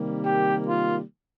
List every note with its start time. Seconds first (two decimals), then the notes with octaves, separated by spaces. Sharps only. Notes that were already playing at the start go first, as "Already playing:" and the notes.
Already playing: C3 D#3 G3 A#3
0.24 G4
0.67 F4